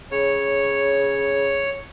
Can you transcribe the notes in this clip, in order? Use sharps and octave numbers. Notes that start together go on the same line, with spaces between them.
C#3 C#5